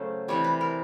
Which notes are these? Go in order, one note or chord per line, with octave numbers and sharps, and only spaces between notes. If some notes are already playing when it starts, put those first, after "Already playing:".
Already playing: C#3 F#3 A3 C5
C3 E3 G3 C#5
B4
A#4